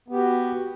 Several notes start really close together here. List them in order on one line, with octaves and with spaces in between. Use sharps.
B3 G4 F#4